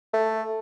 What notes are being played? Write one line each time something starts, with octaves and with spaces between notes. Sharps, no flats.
A3